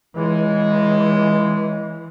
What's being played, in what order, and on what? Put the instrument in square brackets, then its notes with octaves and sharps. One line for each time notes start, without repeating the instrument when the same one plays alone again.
[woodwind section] C#2 G#3 [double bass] E3